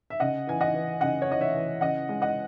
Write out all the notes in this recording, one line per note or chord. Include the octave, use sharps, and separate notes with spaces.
E5
C#3 D#5 F#5
E3 G#5
D#5 F#5
E3
C#3 D#5 F#5
C#5
E3 D#5
C#5 E5
E3
C#3 D#5 F#5
G#3
D#5 F#5